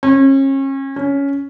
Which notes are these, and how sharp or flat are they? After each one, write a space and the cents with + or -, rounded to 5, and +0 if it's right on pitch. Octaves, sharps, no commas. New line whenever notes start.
C#4 -35
C#4 +10